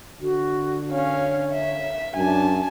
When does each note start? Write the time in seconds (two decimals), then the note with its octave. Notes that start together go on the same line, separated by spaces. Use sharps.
0.21 D3 F#4
0.91 C#4 C#5 F5
1.52 E5
2.16 F#2 D4 G#5 A5